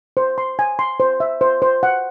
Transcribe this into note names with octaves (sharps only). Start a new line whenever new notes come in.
C5
C6
G#5
C6
C5
E5
C5
C5
F#5